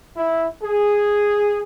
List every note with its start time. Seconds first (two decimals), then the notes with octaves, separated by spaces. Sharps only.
0.16 E4
0.62 G#4